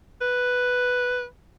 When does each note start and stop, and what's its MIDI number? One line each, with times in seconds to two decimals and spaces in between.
0.21 1.24 71